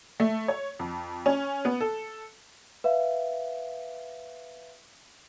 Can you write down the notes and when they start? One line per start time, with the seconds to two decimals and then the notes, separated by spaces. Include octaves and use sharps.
0.20 A3
0.48 C#5
0.79 F2
1.26 C#4
1.65 B3
1.81 A4
2.84 B4 E5 F5